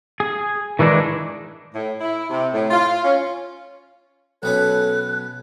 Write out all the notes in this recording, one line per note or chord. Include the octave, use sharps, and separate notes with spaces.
G#4
D#3 E3 G#3 D4 D#4
A2
E4
C3
A2
F4
C#4
B1 B3 C#4 A4 F#6